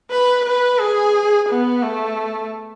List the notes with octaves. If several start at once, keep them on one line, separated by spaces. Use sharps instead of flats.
B4
B4
G#4
B3
A3